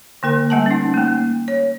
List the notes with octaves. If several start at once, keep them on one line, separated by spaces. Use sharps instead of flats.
D3 A#3 A#4
G3 A3 F#5 G#5 A5
C#4 D#4
A3 A#3
C#5